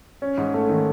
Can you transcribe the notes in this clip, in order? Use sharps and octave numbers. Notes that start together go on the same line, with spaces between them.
C#4
G#2
A3
D#3